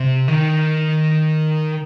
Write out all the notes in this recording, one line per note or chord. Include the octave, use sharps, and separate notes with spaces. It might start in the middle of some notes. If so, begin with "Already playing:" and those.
Already playing: C3
D#3